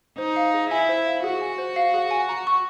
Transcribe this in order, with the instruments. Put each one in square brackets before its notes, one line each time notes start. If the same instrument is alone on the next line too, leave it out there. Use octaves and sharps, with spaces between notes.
[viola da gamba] D#4 [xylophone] C5
[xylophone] F5
G#4
[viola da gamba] E4 [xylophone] G#5
[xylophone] C5
F5
[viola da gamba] F#4 [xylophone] G#4
[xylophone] G#5
C5
F5
G#4
G#5
A#5
C#6